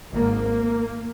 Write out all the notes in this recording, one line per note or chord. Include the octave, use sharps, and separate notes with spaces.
G#1 G#2 A#3